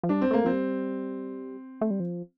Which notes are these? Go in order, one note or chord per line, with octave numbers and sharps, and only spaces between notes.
F3
G3 D4
C4
A3 A#3
F3 C4
G3
A3
G3
F3